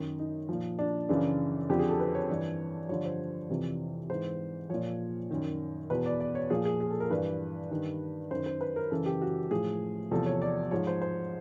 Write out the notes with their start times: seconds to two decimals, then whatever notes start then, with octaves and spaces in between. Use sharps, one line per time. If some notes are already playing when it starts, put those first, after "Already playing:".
Already playing: F#2 D#3 D#4
0.19 D#4
0.49 A#2 F3
0.79 D4
1.09 F#2 C#3 E3 D4
1.69 F2 D3 F3 G4
1.79 G#4
1.89 A4
2.00 B4
2.15 C#5
2.29 G2 E3
2.89 G2 D3 F3 C#5
3.05 C5
3.49 F2 C3 E3
4.10 G#2 E3 C5
4.69 A#2 F3 C#5
5.31 F#2 D#3
5.90 E2 B2 B4
6.06 D5
6.20 D5
6.35 C#5
6.50 A#2 F3 G#4
6.65 G#4
6.81 G#4
6.90 A4
7.00 A#4
7.10 G2 E3 B4
7.71 G2 D#3
8.31 F#2 D#3 C5
8.46 C5
8.61 B4
8.76 A#4
8.91 F#2 C#3 E3 A4
9.06 G4
9.22 F#4
9.51 A2 F3 G#4
10.11 E2 C3 F3 A4
10.26 C#5
10.42 D5
10.71 G#2 F3 C#5
10.87 C5
11.02 C5